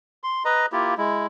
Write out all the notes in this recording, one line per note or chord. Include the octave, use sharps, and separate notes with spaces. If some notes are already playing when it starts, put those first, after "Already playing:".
C6
B4 D#5 A#5
A#3 E4 F4 G4
G#3 E4